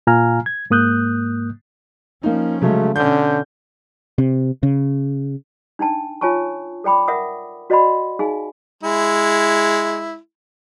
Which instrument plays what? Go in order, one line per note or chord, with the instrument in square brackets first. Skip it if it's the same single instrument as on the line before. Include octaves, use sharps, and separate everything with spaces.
[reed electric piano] A#2 F4 F5 G#5 A#5 F6
G#6
G#2 A#3 D#6 F#6 G6
[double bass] F3 C#4 [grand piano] A#3 D#4
[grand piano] C#3 F#3 G#3 [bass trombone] A3
[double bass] B2 C#4 [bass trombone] D3 [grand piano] G6
[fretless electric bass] C3
C#3
[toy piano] D4 D#4 G5 A5
F4 C#5 G#5 A5 C#6
A4 D5 G5 B5 D6
A#4 E5 F#5 D#6
F#4 D5 D#5 F#5 B5 C6
D#4 G#4 F5 G#5
[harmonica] G#3 E4